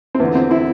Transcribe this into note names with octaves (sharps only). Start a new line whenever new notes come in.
C4
E2 D3 B3
C4
C4 E4